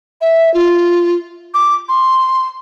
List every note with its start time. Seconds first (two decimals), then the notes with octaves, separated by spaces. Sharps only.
0.21 E5
0.54 F4
1.54 D6
1.89 C6